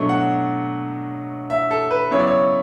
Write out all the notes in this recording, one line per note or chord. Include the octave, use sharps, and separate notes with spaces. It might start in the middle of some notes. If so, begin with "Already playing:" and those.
Already playing: B2 F#3 A3 D4 C#6
F#5
E5
A4
B4
C#3 F#3 B3 E4 C#5
D5
C#5